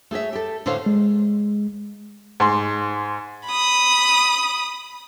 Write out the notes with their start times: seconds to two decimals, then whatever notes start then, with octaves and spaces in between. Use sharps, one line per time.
0.11 A3 G#4 C#5 E5
0.33 G4 A4
0.66 A2 D3 A4 C5 C#5 F5
0.86 G#3
2.40 G#2 C6
3.48 B5 D#6